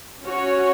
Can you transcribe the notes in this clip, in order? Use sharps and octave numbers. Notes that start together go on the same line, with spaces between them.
C#4 F#4 C#5